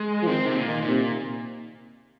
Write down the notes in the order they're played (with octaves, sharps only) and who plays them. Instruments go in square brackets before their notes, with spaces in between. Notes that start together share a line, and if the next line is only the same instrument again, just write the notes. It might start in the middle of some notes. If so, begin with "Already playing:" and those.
Already playing: [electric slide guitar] G#3
[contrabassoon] F3
[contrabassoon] D#3 [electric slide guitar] C4
[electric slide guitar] C3
A#2
[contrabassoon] D#3
[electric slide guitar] A#2
[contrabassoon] C3